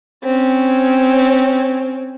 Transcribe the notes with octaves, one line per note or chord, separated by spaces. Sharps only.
C4 C#4